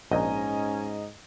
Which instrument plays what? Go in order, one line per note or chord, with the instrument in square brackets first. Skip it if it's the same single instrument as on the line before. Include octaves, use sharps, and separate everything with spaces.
[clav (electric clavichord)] A#1 [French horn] G#2 [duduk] C#4 [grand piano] D#5 A#5